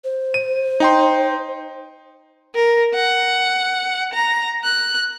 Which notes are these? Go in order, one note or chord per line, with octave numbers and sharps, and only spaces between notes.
C5
D#7
D#4 G5 C6
A#4
F#5
A#5
F#6